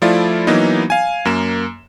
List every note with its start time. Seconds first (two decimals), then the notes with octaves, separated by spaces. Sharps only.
0.02 F3 A3 E4 F4 D5
0.47 E3 F#3 A#3 B3 D#4
0.90 F5 G#5
1.25 F#2 A#3 E7